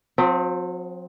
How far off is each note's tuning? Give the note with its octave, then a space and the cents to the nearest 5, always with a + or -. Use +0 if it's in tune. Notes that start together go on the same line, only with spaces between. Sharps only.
F#3 -45 C4 +0